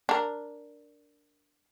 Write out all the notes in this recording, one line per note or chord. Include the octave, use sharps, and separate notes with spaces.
D4 A#4